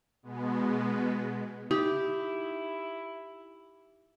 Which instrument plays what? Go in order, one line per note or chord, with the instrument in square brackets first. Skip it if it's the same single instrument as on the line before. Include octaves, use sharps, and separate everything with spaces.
[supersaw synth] B2 G#3 B3
[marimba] D#4 [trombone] E4 [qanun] G4